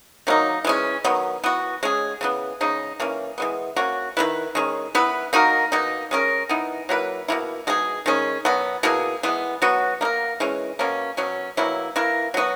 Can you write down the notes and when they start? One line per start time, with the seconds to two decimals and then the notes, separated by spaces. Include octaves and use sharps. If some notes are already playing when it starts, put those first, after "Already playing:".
0.27 D#3 F#3 A#3 D#4
0.64 E3 G#3 C#4
1.04 D#3 F#3 B3
1.44 E3 B3 F#4
1.83 G#3 C#4 G#4
2.21 C#3 E3 B3
2.61 C#3 G#3 D#4
3.00 E3 A#3 C#4
3.38 E3 G#3 B3
3.76 A#3 C#4 F#4
4.17 D#3 A#3 E4 B4
4.55 D#3 G#3 C#4
4.95 E3 B3 E4 B4
5.33 A#3 D#4 F#4 A#4
5.72 B2 A#3 D#4
6.11 G#3 C#4 F#4 A#4
6.49 E3 B3 D#4
6.89 F#3 A#3 E4 B4
7.28 B2 F#3 A#3 E4
7.67 B2 G#3 D#4 G#4
8.06 D#3 G#3 C#4
8.45 B2 F#3 B3
8.83 B2 A#3 E4 G#4
9.23 E3 G#3 B3
9.62 F#3 B3 F#4
10.01 A#3 D#4
10.05 A#4
10.40 E3 G#3 C#4
10.79 B2 A#3 C#4
11.17 B2 F#3 C#4
11.57 B2 F#3 A#3 E4
11.96 E3 A#3 E4 A#4
12.34 F#3 B3 F#4